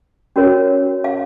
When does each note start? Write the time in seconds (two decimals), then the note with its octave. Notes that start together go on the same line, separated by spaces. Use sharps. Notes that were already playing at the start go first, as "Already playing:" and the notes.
0.36 C#4 F#4 A#4 C#5
1.04 F5